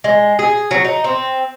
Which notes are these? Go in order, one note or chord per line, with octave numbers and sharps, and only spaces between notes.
G#3
G#4
F#3
D#4
C4